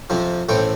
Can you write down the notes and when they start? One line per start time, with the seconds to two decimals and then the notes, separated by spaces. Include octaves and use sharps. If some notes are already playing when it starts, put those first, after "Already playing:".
0.10 F2 C3 F3 C4
0.49 A1 A2 E3 A3 C4 G5